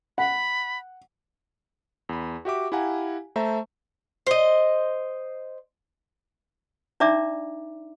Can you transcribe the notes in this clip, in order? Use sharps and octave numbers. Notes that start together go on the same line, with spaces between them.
F#5 B5
E2 B5
F#4 G4 E5 D6
E4 G4 F5 F#5 G#5 A#5
A3 C5 E5 A5 A#5
C5 D#5
D4 D#4 D5 E5 A#5 D6